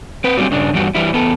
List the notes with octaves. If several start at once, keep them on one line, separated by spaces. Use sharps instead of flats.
C4 B4
F#3 G3 A3 A#3 C4 G4
G2 C#3 D4
E2 G2 G3 F4 F#4
E3 G3 E4
E2 B3 A4